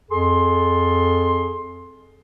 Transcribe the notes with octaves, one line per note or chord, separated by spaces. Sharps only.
F2 G#4 A4 C6